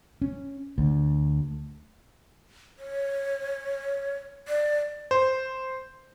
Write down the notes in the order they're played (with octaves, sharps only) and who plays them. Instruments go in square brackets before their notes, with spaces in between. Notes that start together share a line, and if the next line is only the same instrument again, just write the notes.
[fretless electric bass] C#4
D2
[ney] C#5
D5
[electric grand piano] C5